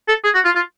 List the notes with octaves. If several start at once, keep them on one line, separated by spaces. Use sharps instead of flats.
A4
G#4
F#4
F4
F4